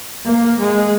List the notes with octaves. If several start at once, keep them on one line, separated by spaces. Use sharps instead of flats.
A#3
G#3